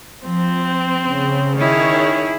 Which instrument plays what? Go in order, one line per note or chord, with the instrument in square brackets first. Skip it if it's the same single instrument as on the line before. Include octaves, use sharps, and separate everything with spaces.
[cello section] F3 [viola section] C4
[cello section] C#3
[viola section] D#3 C#5 [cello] E4 G#4